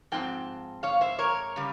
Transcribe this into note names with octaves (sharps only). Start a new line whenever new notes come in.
G#2 F3 C4 G5
C#5 F5
C5 E5
A#4 C#5
C#3 G3